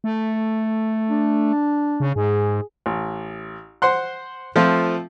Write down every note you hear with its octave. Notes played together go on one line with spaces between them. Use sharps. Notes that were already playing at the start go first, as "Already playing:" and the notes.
A3
D4
C#3
G#2 G#4
A1
C5 F#5 C6 F#6
F3 A3 C4 F4